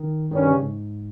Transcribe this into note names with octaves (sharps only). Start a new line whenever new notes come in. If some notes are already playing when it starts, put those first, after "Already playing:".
Already playing: D#3
G2 D#3 G3 C#4
C#3
G#2